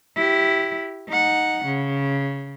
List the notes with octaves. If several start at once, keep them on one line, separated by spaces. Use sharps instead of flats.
E4 G4
D#4 F#5
C#3